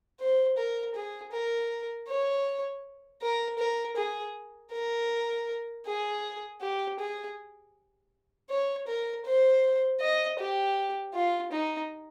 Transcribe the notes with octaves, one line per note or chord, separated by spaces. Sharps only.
C5
A#4
G#4
A#4
C#5
A#4
A#4
G#4
A#4
G#4
G4
G#4
C#5
A#4
C5
D#5
G4
F4
D#4